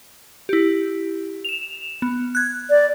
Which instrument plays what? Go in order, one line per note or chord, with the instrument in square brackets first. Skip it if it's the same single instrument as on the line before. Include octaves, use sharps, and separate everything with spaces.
[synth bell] E4 G4
E7 F7
B3
F#6 G#6
[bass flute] D5